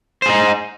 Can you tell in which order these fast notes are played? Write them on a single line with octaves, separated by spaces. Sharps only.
C5 G#4 D#4